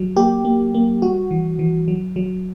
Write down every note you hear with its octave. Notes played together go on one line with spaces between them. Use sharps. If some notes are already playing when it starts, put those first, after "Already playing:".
Already playing: F#3
A#3 G4
A#3
A#3
G3 F#4
E3
E3
F#3
F#3